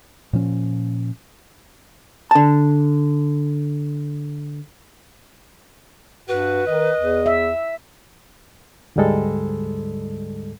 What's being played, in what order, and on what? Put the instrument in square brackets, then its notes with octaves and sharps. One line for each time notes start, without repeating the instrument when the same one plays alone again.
[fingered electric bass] A#2 F3 C#4
[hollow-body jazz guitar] D3 A5
[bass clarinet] G2 [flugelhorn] F#4 [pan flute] B4
[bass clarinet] D#3 [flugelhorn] D#5
[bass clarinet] E2
[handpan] E5
[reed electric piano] D2 G#2 D3 G3 G#3 A4